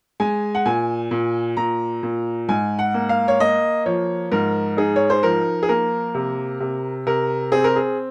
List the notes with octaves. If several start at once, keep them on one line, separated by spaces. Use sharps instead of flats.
G#3 G#5
F#5
A#2 G#5
A#2
A#2 A#5
A#2
G#2 G#5
F#5
A#3
F5
C#5
A#3 D#5
F3 C#5
G#2 A#4
D#4 G#4
C#5
C5
F3 A#4
G#4
A#3 A#4
C3
C3
C3 A#4
C4 G#4
A#4
G#4